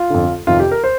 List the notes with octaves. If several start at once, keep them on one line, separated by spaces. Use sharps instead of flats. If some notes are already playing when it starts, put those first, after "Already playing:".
Already playing: F4
F2 D3
F2 C3 D#3 F4
G4
A#4
C5